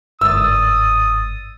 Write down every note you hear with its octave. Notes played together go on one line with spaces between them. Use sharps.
G1 G#2 D#6 E6 A6